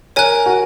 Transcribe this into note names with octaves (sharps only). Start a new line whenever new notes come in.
A#4 C#5 G#5 F#6
F#4